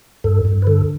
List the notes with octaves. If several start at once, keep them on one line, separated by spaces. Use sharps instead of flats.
G2 A4
G2
B4
D3 A4